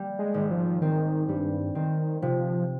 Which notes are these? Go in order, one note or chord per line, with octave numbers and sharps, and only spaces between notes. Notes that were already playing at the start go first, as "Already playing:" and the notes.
Already playing: G3 A#3
G#3
G#1
F3
D#3 C4
G2 G3
D#3 C4
C3 F3